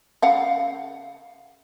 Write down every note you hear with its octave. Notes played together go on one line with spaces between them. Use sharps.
C#3 F5 F#5